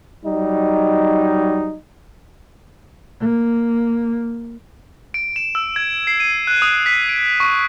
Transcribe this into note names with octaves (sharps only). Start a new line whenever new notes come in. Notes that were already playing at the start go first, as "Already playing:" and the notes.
F#3 G3 D#4
A#3
D7
E7
E6
G#6
C7
D#7
F#6
D#6
B6
D7
C#6